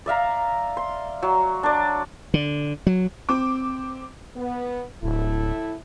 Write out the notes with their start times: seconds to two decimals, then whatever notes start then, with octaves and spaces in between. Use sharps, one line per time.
0.06 D5 E5 F5 A#5
0.77 C6
1.23 F#3
1.63 D4 D5
2.34 D3
2.87 F#3
3.29 C4 D6
4.36 B3
5.03 D1 A2 A3 E4